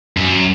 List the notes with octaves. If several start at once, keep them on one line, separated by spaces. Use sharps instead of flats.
F#2